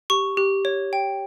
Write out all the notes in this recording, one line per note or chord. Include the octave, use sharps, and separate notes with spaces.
G4 C#6
G4
C#5
G5